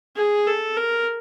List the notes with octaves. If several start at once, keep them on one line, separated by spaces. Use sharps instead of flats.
G#4
A4
A#4